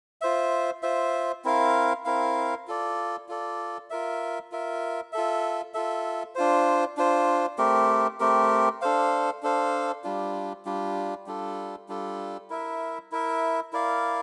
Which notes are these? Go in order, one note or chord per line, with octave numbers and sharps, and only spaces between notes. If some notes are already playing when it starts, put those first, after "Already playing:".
F4 C5 E5
F4 C5 E5
C4 E4 A#4 F5
C4 E4 A#4 F5
F4 A4 D5
F4 A4 D5
F4 A#4 E5
F4 A#4 E5
F4 A4 E5
F4 A4 E5
D4 F4 C5
D4 F4 C5
A3 C4 G4 A#4
A3 C4 G4 A#4
D4 A4 C5 F5
D4 A4 C5 F5
G3 D4 F4
G3 D4 F4
G3 D4 F4 A4
G3 D4 F4 A4
E4 A#4 E5
E4 A#4 E5
E4 A#4 D5 F5